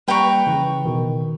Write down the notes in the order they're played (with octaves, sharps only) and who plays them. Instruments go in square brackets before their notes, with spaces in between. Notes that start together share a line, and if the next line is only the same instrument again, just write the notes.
[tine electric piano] G3 A#3 [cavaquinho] B4 G5 A#5 C#6
[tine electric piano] C#3 E3
B2 D#3